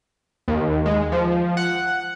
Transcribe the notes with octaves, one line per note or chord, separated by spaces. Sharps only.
D#2
G#3
F3
F#5